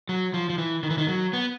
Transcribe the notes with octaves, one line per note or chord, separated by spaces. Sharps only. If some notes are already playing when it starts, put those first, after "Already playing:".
F#3
F3
F3
E3
D#3
E3
D#3
F#3
B3